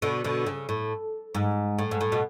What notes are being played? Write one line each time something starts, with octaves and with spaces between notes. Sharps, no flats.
B2 D3
B2 D3
C#3
A2
G#2
A2
G#2
A2
B2